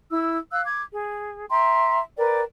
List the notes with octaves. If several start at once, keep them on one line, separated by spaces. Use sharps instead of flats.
E4 E6
F5 E6 F#6
D6 G#6
G#4
E5 G5 A#5 C6
A#4 B4 D5 G5